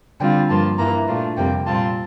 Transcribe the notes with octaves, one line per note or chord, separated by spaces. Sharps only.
D3 G3 C4 F4 G5
G2 F3 A#3 F4 A5
G2 E3 A#3 A#5
A#2 A3 D4 F4
F2 C3 G3 A#3 G5
A#2 G3 C4 F4 A5